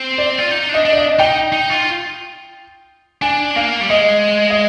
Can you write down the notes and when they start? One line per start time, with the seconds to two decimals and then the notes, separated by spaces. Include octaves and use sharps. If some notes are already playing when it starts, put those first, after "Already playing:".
Already playing: C4
0.18 D5
0.38 F4
0.51 D#4
0.69 D4 D#5
0.85 D4
0.92 D5
0.97 D#5
1.19 D#4 G5
1.52 D#4
1.70 F4
3.22 D4 G#5
3.56 A#3 F5
3.81 G3
3.90 G#3 D#5
4.50 D#5